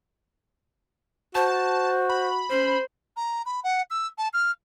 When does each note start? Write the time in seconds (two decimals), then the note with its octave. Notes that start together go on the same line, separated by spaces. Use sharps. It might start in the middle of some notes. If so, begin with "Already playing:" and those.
1.35 F#4 C5 A5
2.09 B5
2.50 C#4 C5
3.16 A#5
3.45 B5
3.64 F#5
3.90 E6
4.18 A5
4.33 F6